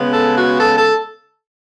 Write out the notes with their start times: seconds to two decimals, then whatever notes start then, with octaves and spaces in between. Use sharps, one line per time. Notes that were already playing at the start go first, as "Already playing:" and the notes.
Already playing: C#3 G#3 B3
0.11 A4
0.36 F#4
0.60 A4
0.77 A4